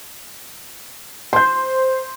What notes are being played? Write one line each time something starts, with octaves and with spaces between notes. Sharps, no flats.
C5 C6 G6